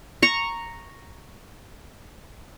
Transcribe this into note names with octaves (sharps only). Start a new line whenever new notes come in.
A#5 C#6